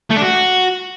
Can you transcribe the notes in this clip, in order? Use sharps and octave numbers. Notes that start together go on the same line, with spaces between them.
A3
D4
F#4